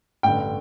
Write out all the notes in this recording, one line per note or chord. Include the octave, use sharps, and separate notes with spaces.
A1 G2 D3 G5